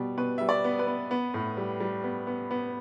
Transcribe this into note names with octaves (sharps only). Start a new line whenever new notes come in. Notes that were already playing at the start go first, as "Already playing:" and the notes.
Already playing: B2 G3
B2 B4
G3 E5
D5
B3
B4
B3
B3
A2
G3
G3
B3
B3
B3